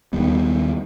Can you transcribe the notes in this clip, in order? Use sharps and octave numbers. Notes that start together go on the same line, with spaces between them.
D#2 D#3 G3 B3